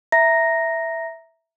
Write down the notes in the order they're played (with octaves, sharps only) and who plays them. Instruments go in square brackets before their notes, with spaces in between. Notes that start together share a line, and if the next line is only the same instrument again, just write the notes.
[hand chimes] E5 A#5 A#6